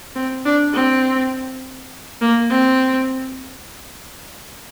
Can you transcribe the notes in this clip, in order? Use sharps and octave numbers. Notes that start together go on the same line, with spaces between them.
C4
D4
C4
A#3
C4